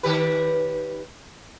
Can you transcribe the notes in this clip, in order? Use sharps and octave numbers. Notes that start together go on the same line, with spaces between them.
D#3 G4 B4